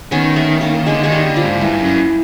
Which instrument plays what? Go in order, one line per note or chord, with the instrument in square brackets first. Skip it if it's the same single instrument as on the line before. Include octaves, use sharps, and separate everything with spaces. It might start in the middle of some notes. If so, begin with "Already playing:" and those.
[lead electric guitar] D#3 [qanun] B3 C#4
[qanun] A3 B3
A#3
[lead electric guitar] D3 [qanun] G#3
[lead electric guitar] D#3 [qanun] G#3
[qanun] G3
[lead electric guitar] D3
[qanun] F3
[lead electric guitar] G#2
[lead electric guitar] G2 [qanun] E3
[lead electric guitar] F#2